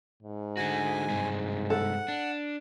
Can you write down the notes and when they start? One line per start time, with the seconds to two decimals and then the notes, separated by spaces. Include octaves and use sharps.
0.22 G#2
0.57 D3 F#4 G#5
1.10 G2 C3 G#3
1.70 A4 F#5
2.08 D4